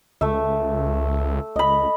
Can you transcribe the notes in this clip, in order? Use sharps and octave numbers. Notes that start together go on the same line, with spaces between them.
C#2 A3 E5
C#2 D#5 B5